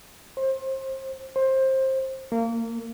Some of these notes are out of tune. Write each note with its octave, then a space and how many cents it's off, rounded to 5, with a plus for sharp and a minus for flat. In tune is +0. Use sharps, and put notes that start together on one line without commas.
C5 +30
C5 +20
A#3 -25